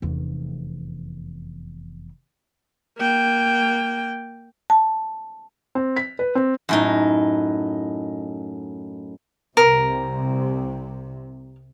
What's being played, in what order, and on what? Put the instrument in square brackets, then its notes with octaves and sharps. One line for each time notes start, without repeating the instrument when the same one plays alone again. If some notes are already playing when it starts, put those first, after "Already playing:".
[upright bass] F1 E2
[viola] A#3 G5
[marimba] A5
[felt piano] C4
B6
B4
C4
[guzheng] F#2 A2 D#4
[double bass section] C2 C3 [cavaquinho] A#4